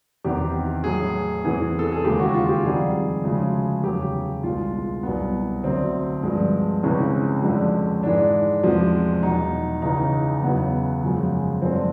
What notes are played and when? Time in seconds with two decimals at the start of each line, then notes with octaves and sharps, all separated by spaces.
0.24 E2 C3 D#3 G4
0.84 A2 F#3 G#4
1.44 E2 C3 E3 G#4
1.79 A4
1.92 G#4
2.04 D#2 C#3 E3 G#3 G4
2.19 F#4
2.34 F4
2.49 G4
2.64 F2 C3 D#3 G3 G#4
3.24 D2 C#3 F3 G#3
3.84 E2 C#3 F#3 G4
4.43 C2 B2 G#3 F4
5.03 C2 B2 F#3 B3
5.64 D2 D3 F#3 C4
6.23 G2 D3 F3 G#3
6.83 C#2 C3 E3 G#3 C#4
7.43 F2 D3 F3 G#3
8.03 G#2 E3 G#3 D4
8.63 E2 C3 F3 G#3
9.22 E2 B2 F#3 D#4
9.82 C#2 C#3 E3 D#4
10.42 E2 C#3 F#3 B3
11.03 F#2 C#3 F3 G#3
11.62 F#2 D3 F3 G#3 C4